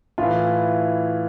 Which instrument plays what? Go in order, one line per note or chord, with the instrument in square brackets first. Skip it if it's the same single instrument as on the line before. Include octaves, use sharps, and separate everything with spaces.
[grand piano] A2 E3 F4